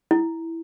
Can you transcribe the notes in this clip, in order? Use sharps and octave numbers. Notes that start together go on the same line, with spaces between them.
E4